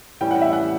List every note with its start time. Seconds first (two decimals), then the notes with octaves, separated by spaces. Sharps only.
0.21 A2 E3 G3 C#4 E4 G5
0.31 F#5
0.42 E5
0.53 F#5